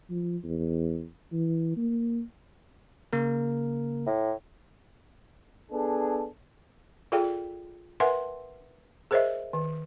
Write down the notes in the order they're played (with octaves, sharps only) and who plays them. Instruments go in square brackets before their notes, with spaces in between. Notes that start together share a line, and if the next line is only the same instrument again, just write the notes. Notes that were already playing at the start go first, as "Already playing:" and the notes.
[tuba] F3
E2
E3
A#3
[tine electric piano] C#3 A#3 A#4
[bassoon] A2
[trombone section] B3 D4 G#4 A4
[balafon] F4 G#4 A4 D5 F5 G5
A#4 B4 E5 F#5 G#5 C6
G#4 A#4 C5 C#5 D#5 E5
D#3